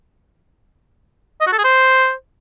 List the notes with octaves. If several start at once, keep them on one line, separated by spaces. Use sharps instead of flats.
D#5
F#4
A4
G#4
C5